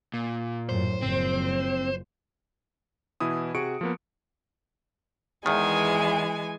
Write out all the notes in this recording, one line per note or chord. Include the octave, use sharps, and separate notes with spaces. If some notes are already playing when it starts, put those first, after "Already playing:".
A#2
F#2 A2 C5
F#1 F3 C4
B2 E3 E4 D#6
C3 F#4 G#4 C#6 C#7 D7
F3 A#3 B3
E2 D#3 E3 G#3 G#5